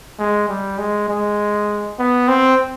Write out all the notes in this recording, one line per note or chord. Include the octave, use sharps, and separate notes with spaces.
G#3
G3
G#3
G#3
B3
C4